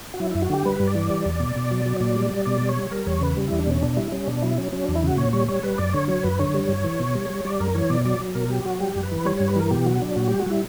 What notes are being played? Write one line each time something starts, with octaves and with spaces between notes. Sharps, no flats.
F#4
F#3 E4
F#2 E4
F#4
D3 G4
G3 B4
G2
D5
E3
G3
E2
B2
B2
F#3
F#3
A#2 D5
G3
G3
B2 D5
G3
C#5
G3
G3 A#4
E2 C#5
C#3 B4
G3
E2 E4
D4
B2 C#4
B2 D4
G3 E4
G3 C#4
B2 D4
F#3 E4
F#3 C#4
F#3 C#4
E2 D4
E4
C#3 F#4
A#2 C#5
G3 C#5
G3 C#5
G3 B4
F#2 D5
D3 C#5
F#3 C#5
F#2 B4
D3 C#5
G3
G2
E3
B2
G3
G3
G3 D5
F#2 A#4
E3 C#5
B2 D5
F#3 D5
F#3
B2 A#4
F#3 G4
F#3 F#4
G3 G4
F#2
B4
E3
G3 C#5
G2 C#5
B4
E3 A#4
B2 G4
F#3 F#4
F#3 D4
A#2 F#4
G3 G4
F#4
G3 E4